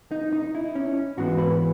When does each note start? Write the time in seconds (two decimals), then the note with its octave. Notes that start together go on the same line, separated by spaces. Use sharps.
0.11 D#4
0.33 D#4
0.55 E4
0.75 C#4
1.17 G#2 E3 G#3 B3 F#4
1.38 B4